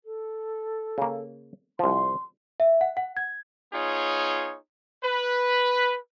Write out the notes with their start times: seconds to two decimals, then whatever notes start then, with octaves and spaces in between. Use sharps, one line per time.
0.04 A4
0.98 C#3 A#3
1.79 C2 F3 C6
2.60 E5
2.81 F#5
2.97 F#5
3.17 G#6
3.73 B3 D#4 F4 G#4 C#5
5.04 B4